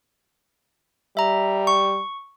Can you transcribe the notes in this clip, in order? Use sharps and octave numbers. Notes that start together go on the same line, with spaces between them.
G3 E5 A#5
C#6